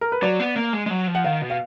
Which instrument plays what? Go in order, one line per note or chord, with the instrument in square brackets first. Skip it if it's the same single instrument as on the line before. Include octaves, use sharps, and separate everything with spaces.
[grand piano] A#4
B4
[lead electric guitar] F#3 [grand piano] D5
[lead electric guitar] B3
A#3
G#3
G#3
F#3
F3
[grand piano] F#5
[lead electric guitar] D#3 [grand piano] F5
[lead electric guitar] B2
[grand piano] F5